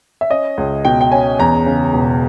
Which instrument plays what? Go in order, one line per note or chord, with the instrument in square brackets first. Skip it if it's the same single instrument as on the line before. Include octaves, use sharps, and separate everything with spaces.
[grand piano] E5
C#4 D#5
C#2
B2 G5
G5
C#4 G#5
E2 A#5
C#3
E1